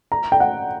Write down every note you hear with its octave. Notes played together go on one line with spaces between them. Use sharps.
A#5
G5
F#5